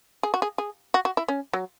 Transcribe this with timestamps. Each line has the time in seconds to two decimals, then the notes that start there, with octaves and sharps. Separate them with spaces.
0.23 G#4
0.34 F#4
0.42 G#4
0.58 G#4
0.94 F#4
1.05 F#4
1.17 E4
1.28 C#4
1.53 F#3